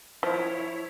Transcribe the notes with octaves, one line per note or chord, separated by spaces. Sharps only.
F3 E4 C#5